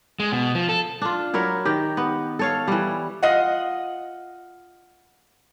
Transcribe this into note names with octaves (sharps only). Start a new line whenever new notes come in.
G#3
B2
F3
A4
D4 F4
F#3 E4 A#4 C#5
D#3 G4
B3
A4 C#5 F5
E3 G3
F4 D#5 F#5